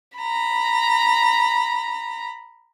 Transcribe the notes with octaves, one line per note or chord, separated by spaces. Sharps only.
A#5 B5